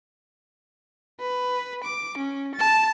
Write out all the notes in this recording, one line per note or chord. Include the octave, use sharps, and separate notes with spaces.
B4
D6
C#4
A5 A6